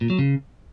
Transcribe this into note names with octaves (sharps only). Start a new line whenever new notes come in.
A#2
F#3
C#3